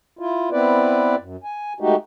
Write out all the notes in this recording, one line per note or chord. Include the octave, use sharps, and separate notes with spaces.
E4 F4
B3 C4 E4 B4 D5
F#2
G#5
G#3 A3 D#4 F#4 G4